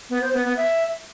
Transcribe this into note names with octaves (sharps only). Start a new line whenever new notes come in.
B3
C5
B3
B3
E5